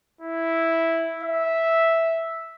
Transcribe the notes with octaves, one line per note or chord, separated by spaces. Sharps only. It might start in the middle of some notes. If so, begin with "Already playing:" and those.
E4
E5